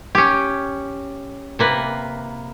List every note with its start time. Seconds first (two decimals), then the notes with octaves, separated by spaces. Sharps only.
0.15 C#4 G4
1.59 C3 A#3 B4